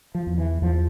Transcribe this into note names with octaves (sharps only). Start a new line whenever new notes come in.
F3
E2
E3
E2 F3